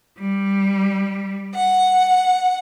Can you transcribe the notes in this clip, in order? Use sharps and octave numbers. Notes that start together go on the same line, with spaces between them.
G3
F#5